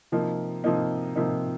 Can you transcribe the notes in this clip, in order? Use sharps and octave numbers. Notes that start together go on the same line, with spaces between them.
C3 F3 A#3 D#4
C3 F3 A#3 D#4
C3 F3 A#3 D#4